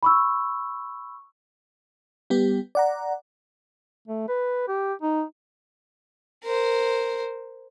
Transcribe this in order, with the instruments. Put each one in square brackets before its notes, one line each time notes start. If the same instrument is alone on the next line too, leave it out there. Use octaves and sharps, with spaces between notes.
[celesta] B5 C#6 E6
[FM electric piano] G3 B3 G4
D5 F#5 A#5
[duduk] A3
B4
G4
D#4
[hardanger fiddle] A#4 C5